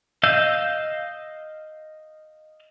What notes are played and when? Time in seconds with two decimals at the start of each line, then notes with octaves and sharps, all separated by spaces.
0.23 D#5 F5 E6 G6